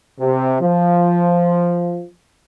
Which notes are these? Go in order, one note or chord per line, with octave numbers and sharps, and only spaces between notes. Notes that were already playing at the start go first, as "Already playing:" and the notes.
C3
F3